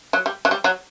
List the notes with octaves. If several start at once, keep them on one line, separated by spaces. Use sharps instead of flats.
F#3
G3
F#3
G3
F#3